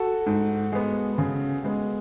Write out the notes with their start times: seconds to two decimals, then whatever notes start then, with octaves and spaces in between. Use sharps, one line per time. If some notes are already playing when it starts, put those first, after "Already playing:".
Already playing: F#4 A4
0.27 G#2
0.72 G#3 B3
1.18 C#3
1.64 G#3 B3